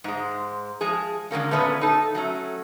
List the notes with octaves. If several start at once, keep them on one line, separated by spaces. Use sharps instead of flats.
G#2 G#3
F3 G#3 G#4
D3 G#3 A#3 C#4
A#2 A3 B3 C#4 B4
D#4 A4
F#3 A3 C#4